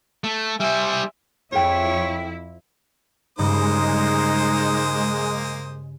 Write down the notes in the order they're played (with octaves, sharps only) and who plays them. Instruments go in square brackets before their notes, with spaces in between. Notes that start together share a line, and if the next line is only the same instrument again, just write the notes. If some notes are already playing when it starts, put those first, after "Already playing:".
[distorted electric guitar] A3
[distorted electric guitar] G3 C5 [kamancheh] E5 G#5
[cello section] F2 E4 [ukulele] F4 G#4 G5 [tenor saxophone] C#5
[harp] G2 C#3 [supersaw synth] G#3 [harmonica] A#3 C5 D#6 [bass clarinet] D#4